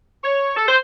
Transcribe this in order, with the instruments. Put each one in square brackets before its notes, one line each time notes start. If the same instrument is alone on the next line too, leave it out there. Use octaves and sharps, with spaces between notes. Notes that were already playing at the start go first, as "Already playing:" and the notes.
[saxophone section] C#5
A4
C5